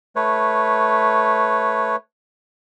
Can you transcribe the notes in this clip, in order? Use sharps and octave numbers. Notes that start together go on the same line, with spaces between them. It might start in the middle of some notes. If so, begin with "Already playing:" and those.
A3 B4 C#5